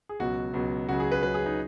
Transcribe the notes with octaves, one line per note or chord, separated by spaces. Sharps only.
G#4
C#2 B2 F#3 F#4
C#2 B2 F#3
C#2 C#3 F#3 F#4
G#4
B4
C#2 C#3 F#3 B4
G#4
D#4